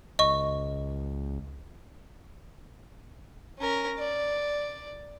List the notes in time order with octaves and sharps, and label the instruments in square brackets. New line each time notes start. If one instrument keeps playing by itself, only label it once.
[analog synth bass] C#2 [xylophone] D#5 C#6
[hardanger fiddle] C#4 A#4
D5